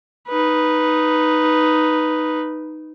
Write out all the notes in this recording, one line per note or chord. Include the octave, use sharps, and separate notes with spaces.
D#4 B4